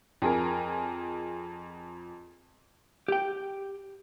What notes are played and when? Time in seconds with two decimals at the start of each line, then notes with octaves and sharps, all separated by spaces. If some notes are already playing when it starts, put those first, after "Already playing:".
0.22 F2 G#4 A#4
3.08 G4 G5